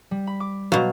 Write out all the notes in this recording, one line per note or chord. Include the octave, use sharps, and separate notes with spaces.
G3
B5
D6
B2 F#3 F5